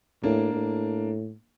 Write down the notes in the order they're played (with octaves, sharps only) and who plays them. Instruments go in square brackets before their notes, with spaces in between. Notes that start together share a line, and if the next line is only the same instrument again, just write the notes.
[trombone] A2 [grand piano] A#3 D4
[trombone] A2